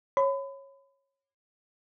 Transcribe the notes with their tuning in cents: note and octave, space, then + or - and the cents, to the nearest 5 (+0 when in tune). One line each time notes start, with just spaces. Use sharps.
C#5 -15 B5 +35